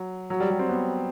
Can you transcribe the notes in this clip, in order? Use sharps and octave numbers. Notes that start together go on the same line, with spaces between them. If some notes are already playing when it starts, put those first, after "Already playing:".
Already playing: F#3
F#3
G3
G3
C4
B3